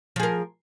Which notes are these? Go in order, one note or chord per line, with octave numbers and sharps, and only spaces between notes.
F3 G#4 A#4